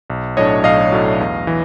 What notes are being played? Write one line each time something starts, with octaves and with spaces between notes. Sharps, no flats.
B1
A2 F#3 A3 D4 C#5 D#5
B1 D#5 F5
A2 F#3 A3 D4
E2
E3